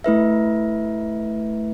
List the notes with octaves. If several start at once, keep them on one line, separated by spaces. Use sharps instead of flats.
A3 E4 B4 E5